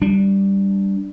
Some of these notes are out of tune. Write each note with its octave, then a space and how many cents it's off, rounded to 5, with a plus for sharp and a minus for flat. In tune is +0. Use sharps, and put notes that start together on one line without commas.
G3 +0 D4 +0